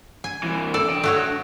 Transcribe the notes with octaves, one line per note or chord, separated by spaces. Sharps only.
G#5
C2 E3
A4 D5
D4 G5
A3 F#4 C#5